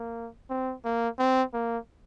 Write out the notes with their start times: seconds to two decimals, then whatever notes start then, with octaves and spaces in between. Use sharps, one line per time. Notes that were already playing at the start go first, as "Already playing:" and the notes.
Already playing: A#3
0.50 C4
0.85 A#3
1.19 C4
1.53 A#3